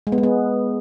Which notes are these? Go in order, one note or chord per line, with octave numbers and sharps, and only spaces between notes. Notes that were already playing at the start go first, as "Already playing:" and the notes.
G#3
B3
G#3
B3